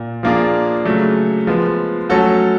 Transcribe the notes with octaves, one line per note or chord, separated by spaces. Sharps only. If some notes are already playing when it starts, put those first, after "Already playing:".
Already playing: A#2
F3 A#3 D4 F4 G#4
C#3 F#3 A3
F3 G#3 B3
F#3 A3 C#4 F#4 A4